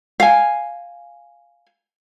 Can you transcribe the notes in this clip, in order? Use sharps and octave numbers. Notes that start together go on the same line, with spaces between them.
F5 G#5